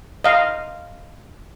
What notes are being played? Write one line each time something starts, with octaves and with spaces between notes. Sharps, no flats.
D#5 F5